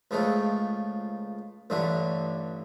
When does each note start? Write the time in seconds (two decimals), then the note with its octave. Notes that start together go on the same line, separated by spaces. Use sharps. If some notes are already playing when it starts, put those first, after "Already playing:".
0.11 C#2 C#3 F3 A3
1.70 A1 G2 D3 A3